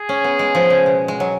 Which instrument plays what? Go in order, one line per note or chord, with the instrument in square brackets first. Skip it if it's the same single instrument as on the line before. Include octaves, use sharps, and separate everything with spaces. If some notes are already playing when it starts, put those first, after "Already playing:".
Already playing: [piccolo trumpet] G#4
[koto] C#4
B3
G#3
F3
C#3
B2
G#3
F#3